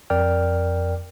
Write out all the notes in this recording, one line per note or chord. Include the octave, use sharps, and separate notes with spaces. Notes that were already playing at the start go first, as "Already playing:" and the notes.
F2 A#4 D5 G5 F6